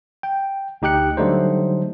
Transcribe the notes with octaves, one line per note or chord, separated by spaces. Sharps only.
G5
D2 D#4 G4 G5 F#6 C#7
D3 F#3 G3 A3 D#4 C5